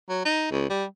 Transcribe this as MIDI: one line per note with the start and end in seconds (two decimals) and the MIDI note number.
0.09 0.24 54
0.25 0.47 63
0.51 0.69 37
0.70 0.85 55